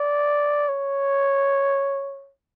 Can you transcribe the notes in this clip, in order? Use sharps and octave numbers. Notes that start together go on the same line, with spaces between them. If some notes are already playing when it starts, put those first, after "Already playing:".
Already playing: D5
C#5